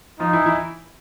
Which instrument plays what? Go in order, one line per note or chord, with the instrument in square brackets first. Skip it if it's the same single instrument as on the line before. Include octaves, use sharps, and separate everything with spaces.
[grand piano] F3 F4 [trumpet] D#4
[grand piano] E3 E4
E3 E4